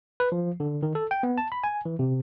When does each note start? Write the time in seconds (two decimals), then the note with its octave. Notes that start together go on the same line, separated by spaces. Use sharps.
0.20 B4
0.32 F3
0.60 D3
0.83 D#3
0.95 A4
1.11 G5
1.23 B3
1.38 A5
1.52 B5
1.64 G#5
1.85 E3
1.99 C3